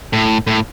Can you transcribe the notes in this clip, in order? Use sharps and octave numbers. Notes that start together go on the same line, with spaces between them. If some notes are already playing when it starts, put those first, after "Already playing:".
A2
A2